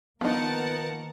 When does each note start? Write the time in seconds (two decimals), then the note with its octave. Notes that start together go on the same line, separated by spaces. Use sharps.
0.21 D#3 F3 A#3 B3 D#4 A#4 F#5 A5